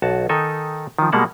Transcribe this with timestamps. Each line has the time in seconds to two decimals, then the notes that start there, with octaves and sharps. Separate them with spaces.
0.02 B1 F#4 A5
0.29 D#3 D#4 A4 G#5
0.99 D#3 F3
1.12 B2 G3 G#3 A#3 F#5 A5